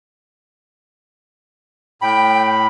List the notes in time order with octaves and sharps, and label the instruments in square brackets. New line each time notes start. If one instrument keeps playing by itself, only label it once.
[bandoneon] A2 B5 [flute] G5